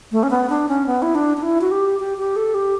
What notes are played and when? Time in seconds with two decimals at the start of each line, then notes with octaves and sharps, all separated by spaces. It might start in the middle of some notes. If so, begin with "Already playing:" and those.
0.12 A3
0.23 C#4
0.31 B3
0.50 D4
0.69 C#4
0.87 B3
1.02 E4
1.15 D4
1.37 D4
1.42 E4
1.61 F#4
1.71 G4
1.99 G4
2.18 G4
2.36 A4
2.54 G4